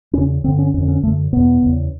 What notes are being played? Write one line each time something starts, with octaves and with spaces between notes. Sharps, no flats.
E2 C#3 C#4
G2 D3 C4
C#4
F2 D3 C#4
C#4
F#2 D3 A3
E2 B2 B3
E2 C#3